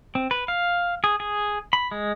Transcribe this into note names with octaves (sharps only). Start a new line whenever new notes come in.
C4
B4
F5
G#4
G#4
B5
G#3